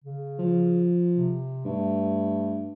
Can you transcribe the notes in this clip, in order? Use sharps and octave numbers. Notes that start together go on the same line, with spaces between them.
C#3
F3
C3
G2 A3